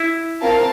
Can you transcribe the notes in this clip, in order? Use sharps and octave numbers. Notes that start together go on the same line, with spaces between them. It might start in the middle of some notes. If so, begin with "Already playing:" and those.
Already playing: E4
C4 F4 A#4 F5 A5